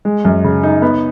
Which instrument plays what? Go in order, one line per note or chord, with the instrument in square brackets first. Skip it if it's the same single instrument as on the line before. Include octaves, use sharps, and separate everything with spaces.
[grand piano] G#3
F#2
C#3
D#4
B3